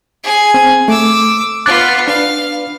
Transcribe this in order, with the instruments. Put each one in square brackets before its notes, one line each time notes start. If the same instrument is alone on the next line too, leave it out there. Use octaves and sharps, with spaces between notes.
[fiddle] G#4 G#5
[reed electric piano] C4
[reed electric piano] A3 [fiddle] D6 E6
[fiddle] B3 F4 [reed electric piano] D6 F#6 A6
[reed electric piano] D4 B4 [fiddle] F5